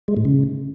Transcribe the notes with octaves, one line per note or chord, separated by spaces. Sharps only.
G#3
A2
C#3